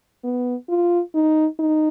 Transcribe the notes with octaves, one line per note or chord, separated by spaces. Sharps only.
B3
F4
D#4
D#4